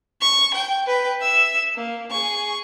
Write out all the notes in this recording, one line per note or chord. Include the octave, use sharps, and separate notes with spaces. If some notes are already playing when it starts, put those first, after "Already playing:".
C#6
G5
B4 G5
E5 E6
A#3
G#4 C#6